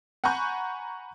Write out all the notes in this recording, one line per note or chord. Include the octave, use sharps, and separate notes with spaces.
F#5 G#5 A#5 B5 C#6 G6